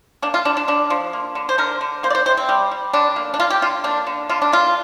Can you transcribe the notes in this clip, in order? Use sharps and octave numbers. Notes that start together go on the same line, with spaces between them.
A#3 D4
F4
D3 D4
D4
D3 D4
F3
A#3
D3
C5
D3 A#4
D3
A#3 C5
D5
C5
C3 C5
C4
G3
G3
D3 D4
A#3
D4
A#3 F4
G4
D3 F4
A#3 D4
D3
D3 F4
D4
A#3 F4